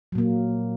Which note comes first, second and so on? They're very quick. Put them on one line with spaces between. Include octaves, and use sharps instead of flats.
F#3 A#2 A#3